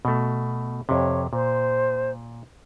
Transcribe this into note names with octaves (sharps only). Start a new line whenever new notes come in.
B2 A3
F2 C3 C#5
A#2 C5